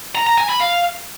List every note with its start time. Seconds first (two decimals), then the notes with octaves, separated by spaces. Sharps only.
0.15 A#5
0.27 A#5
0.38 G#5
0.49 B5
0.60 F5